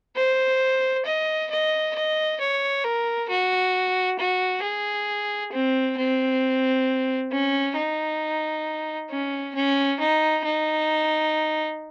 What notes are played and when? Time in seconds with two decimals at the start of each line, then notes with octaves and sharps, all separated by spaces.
0.16 C5
1.05 D#5
1.50 D#5
1.95 D#5
2.40 C#5
2.84 A#4
3.29 F#4
4.19 F#4
4.63 G#4
5.53 C4
5.97 C4
7.31 C#4
7.76 D#4
9.10 C#4
9.55 C#4
9.99 D#4
10.45 D#4